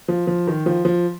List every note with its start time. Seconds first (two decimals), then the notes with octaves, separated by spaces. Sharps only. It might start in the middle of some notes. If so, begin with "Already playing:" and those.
0.08 F3
0.27 F3
0.47 D#3
0.66 F3
0.85 F3